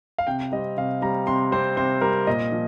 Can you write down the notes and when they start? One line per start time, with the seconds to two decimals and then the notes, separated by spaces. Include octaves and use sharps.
0.18 F5
0.27 C3 G5
0.52 G3 D#5
0.56 C4
0.77 C3 F5
1.02 G3 C4 A#5
1.27 C3 C6
1.52 G3 C4 C5
1.77 C3 C5
2.01 G3 C4 A#4
2.27 A#2 D#5
2.52 F3